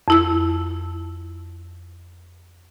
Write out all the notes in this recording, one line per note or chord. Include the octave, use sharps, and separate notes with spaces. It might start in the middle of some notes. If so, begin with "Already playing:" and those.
F2 E4 E6